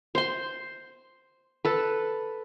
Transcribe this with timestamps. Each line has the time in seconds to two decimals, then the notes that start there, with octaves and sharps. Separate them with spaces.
0.15 C5 C6
1.65 A4 B4